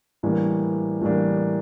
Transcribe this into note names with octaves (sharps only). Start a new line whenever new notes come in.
A2 E3 G3 A#3 D4
A2 E3 G3 A#3 D4